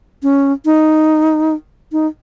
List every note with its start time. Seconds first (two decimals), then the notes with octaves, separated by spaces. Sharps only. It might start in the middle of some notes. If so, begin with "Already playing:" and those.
0.23 C#4
0.65 D#4
1.92 D#4